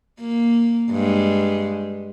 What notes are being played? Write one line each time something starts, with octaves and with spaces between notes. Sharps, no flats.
A#3
G2 G#3